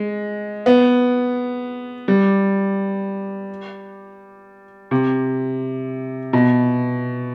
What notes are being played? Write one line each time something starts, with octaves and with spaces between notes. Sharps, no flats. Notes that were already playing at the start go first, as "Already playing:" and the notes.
Already playing: G#3
B3
G3
C3
B2